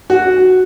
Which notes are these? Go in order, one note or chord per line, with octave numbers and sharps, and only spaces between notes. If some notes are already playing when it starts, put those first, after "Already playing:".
F#4